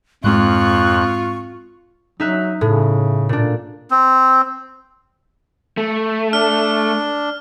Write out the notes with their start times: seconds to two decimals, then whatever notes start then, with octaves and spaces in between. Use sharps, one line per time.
0.24 F2 G#2 G#3 C4 F4 C#6 F#6
2.20 F#3 D#4 E5 F#6
2.61 A2 C#3
3.29 A#2 D4
3.91 C4
5.77 A3
6.33 D4 F6